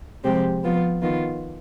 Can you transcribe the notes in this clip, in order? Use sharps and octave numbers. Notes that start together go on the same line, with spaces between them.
C3 F3 G#3 C4 G4
F3 B3 F4
D#3 B3 F4